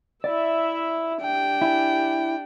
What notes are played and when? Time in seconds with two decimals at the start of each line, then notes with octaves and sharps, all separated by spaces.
0.24 E4 D5 E5
1.22 D4 G4 G5
1.62 E4 G#5